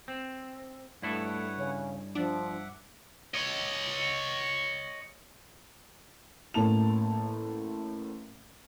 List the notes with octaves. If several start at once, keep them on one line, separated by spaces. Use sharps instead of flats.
C4
G2 A3 E4 A4 B4 C#5 F#5
C#3
F3 D4 E5 F#5 D6
C#5 D#5
A1 A2 A#3 A5 F7